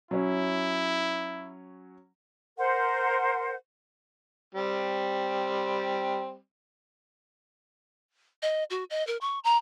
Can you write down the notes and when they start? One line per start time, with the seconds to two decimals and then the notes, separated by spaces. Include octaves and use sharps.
0.11 F#3 C#4 E4
2.58 A#4 C5 F#5
4.55 G3 C4
8.42 D#5
8.70 F#4
8.90 D#5
9.07 A#4
9.21 C#6
9.44 A#5